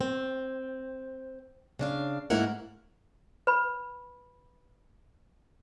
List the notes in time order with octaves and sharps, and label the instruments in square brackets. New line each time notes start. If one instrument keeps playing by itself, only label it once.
[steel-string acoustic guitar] C4
C#3 D4 F5
G#2 A3 A#3 E4 A#4 F#5
[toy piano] B4 B5